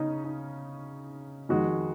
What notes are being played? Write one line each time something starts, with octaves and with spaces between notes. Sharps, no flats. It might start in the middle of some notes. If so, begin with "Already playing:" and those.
Already playing: C#3 C#4 D#4
D#4
F2 D#3 G#3 F#4